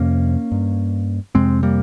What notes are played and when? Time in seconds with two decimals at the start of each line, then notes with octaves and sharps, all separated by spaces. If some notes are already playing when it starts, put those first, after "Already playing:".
Already playing: F2 C3 A#3 C#4
0.52 G2
1.35 F2 C3 G#3 C4
1.63 G3 A#3